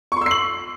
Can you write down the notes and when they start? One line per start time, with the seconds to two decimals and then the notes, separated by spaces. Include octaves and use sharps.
0.12 C#6
0.17 C6
0.21 E6
0.26 C7
0.31 F#7